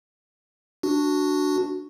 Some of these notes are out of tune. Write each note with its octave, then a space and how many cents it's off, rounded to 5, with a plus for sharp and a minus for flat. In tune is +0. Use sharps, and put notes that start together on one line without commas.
D4 +0 F#4 +0